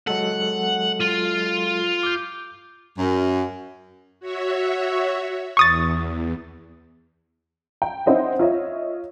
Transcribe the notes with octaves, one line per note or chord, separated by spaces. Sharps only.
F#3 G#3 A4 F#5
F4
D6 G6
F#2
F#4 C#5 E5
E2 C#6 D#6 A6
G5
C4 D#4 E4 C5 D#5 F#5
F4 C#5 D#5 E5